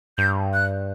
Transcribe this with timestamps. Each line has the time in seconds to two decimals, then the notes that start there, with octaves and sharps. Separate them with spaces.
0.18 G2 G6
0.54 F#6